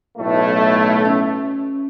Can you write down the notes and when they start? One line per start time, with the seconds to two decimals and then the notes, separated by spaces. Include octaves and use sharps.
0.17 B1 A2 A3
1.05 C#4